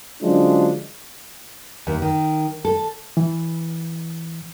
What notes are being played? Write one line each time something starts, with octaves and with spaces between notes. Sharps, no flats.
D3 F3 F#3 G#3 C#4 D4
D#2
D#3
A4
E3